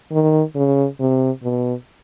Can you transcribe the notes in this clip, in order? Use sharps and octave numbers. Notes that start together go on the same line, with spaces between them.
D#3
C#3
C3
B2